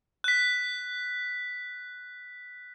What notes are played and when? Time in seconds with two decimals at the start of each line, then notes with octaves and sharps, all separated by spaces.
0.24 F#6 B6